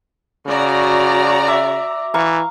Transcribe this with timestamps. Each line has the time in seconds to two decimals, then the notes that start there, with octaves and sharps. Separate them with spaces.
0.47 C#3 F#4 D5 A#5
1.47 E5 D6
2.14 E3 F5 A#5 C#6